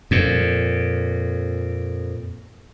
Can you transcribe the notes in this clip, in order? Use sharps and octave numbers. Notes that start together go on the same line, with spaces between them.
F2 A#2